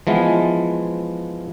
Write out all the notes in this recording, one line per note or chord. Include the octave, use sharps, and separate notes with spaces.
E3 F3 G#3 B3 F4